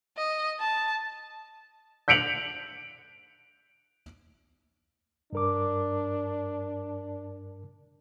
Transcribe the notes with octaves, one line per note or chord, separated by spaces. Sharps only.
D#5
A5
G6 B6 C#7 D7 F7 F#7
G2 D4 A#4 D6